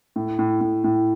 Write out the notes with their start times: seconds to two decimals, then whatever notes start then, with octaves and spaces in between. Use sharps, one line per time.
0.16 A2
0.39 A2
0.61 A2
0.84 A2